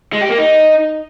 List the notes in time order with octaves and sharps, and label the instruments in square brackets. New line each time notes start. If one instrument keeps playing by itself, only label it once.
[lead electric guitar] G#3
G4
A#3
D#4